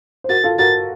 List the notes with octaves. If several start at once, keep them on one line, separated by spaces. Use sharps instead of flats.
C5
F#4 A#4 A6
F4 A4
F#4 A#4 A6